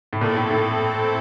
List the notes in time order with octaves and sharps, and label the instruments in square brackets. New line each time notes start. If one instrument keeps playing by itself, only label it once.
[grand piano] A2
[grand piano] A#2 [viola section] C4 E4 A4
[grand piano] A2
A2